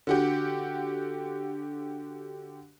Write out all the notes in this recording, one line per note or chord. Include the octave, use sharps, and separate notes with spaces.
D3 F#4 G4